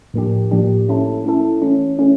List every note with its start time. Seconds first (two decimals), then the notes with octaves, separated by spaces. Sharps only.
0.14 A2 F3 A#3 D4 G4
0.51 A2 F3 A#3 D4 G4
0.88 A3 C#4 E4 A4
1.25 A3 C#4 E4 A4
1.62 E3 A3 C#4
1.99 E3 A3 C#4